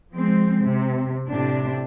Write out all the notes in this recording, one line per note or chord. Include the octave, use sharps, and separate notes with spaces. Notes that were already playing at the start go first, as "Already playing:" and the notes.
F3 G#3 C4
C3
A2 C3 D4